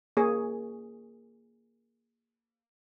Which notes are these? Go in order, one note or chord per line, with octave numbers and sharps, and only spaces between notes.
A#3 G#4 C#5